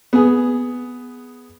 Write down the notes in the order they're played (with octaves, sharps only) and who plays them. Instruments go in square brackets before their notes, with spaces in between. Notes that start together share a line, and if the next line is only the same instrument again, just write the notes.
[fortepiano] B3 G#4